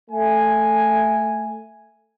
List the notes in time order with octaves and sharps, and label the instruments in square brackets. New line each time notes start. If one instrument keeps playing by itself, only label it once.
[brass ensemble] A3 G#5